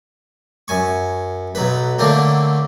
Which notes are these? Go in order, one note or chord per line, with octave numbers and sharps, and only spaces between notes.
F#2 G#5 C#6
B1 F#3 B4
D3 F#3 A3 A#3 C4